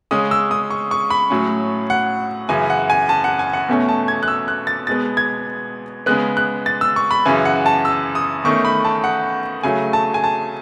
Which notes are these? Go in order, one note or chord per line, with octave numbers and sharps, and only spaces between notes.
C#3 G#3 C#4 D#6
E6
D#6
C#6
C#6
B5
A2 F#3 C#4
F#5
F#2 C#3 E3 G#5
F#5
G#5
A5
F#5
G#5
F#5
E2 B2 A3 C#4
A5
G#6
F#6
E6
F#6
A6
B2 G#3 B3 A6
G#6
C#3 G#3 B3 F#6
F#6
A6
E6
C#6
B5
F#2 C#3 E3 G#5
F#5
A5
E6
D#6
E2 D#3 A3 C#4 C#6
B5
A5
F#5
C#3 F#3 A3 G#5
A5
G#5
A5